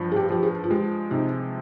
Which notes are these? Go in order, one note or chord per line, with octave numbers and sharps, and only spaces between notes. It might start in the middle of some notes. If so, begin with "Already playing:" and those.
Already playing: G2 F3
G#4
G4
F3 G4
G#4
F4
G#3 G4
C3 D#4